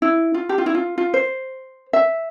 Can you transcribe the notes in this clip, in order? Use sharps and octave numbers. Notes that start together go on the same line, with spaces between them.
E4
F4
G4
F4
E4
F4
F4
C5
E5